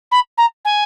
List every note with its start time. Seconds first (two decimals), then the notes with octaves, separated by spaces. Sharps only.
0.11 B5
0.38 A#5
0.65 G#5